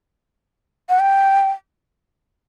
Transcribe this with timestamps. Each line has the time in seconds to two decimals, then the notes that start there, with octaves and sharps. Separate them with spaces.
0.89 F#5
0.99 G5